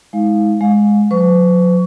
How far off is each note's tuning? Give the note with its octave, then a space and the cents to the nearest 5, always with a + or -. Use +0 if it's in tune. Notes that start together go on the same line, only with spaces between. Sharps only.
G#3 +0 E4 -45 F5 +0
G#3 +0 F5 +35
F#3 -40 B4 +45 C#6 +25